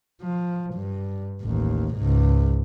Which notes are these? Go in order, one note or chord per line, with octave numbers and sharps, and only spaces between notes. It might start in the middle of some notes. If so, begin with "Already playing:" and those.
F3
G2
A1 D#2
C#2 G#2